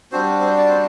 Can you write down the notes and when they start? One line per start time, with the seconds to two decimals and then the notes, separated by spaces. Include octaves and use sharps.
0.12 G3 C4 D4 F#4 C5
0.41 C4 C5
0.58 D5
0.68 C4 C5